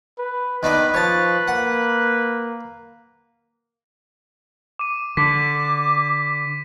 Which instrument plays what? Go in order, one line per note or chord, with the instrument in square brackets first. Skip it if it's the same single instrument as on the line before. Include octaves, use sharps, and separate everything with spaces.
[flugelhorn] B4
[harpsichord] D#3 D4 D#4 [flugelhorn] B3 [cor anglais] B4
[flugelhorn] F3 [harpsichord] C#5 A5
[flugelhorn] A#3 [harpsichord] F#5
[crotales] D6 D#7
[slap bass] D3 [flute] D6 [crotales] B6